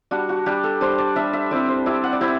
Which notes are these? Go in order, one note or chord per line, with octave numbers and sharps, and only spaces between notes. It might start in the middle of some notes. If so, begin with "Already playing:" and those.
G3 D4 F#4
F#4
G3 D4 G4
A4
G3 D4 C5
D5
G3 D4 E5
E5
G3 C4 E4 D5
C5
G3 C4 E4 D5
F#5
D5
G3 C4 E4 E5